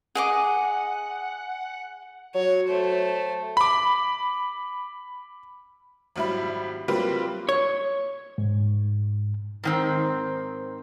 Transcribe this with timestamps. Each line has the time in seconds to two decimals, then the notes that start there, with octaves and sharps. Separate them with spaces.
0.15 G#4 D#5 F#5 D6
2.35 F#3 C#5
2.68 A3 C5
3.57 B5 D6
6.16 G#1 F#3 G3 E4 B5
6.88 F#3 G3 A#3 C4 F4 B4
7.49 C#5
8.38 G#2
9.63 G#2 D#3 C4